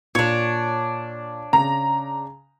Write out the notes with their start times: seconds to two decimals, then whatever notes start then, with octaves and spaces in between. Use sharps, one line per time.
0.15 A#2 D4 C#5
1.53 C#3 A#5